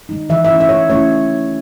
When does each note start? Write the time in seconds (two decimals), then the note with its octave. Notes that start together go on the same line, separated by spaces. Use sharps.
0.09 G#3 D#4
0.29 E3 E5
0.45 E5
0.49 A3 C#4 E4
0.61 E5
0.69 E3 C#5
0.90 A3 C#4 E4 C#5